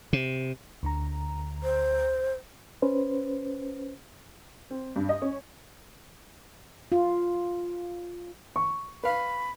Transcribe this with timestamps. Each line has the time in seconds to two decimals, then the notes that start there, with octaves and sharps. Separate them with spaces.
0.13 C3
0.83 D2 D3 A#5
1.63 C5
2.82 C#4 B4 C5
4.70 C4
4.96 G2
5.09 D#5
5.22 C#4
6.92 F4
8.56 C#6
9.04 B4 F5 B5